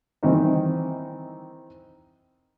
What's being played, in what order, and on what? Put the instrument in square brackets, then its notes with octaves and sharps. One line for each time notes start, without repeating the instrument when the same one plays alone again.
[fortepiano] D#3 E3 C4 D#4